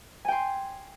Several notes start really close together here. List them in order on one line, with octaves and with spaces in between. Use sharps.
G#5 G5 C6